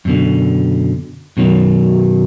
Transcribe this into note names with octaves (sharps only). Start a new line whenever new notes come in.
F#2 B2 D3
F#2 B2 D#3 E3 F#3